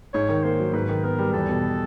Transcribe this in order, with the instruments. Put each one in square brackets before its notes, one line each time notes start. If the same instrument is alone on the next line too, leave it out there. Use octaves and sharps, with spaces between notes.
[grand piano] G#2 [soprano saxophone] C#5
[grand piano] D#3
[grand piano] A#3 [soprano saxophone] C5
[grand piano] F#3
[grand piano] G#2 [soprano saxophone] B4
[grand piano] D#3
[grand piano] B3 [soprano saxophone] A#4
[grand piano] G3
[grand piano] E2 [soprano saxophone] A4
[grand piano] B2